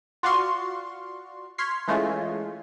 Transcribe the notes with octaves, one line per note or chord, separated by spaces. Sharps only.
F4 F#4 D5 F5 C6 C#6
C6 C#6 F6 G#6 B6 C7
E3 G#3 A3 C#4 F4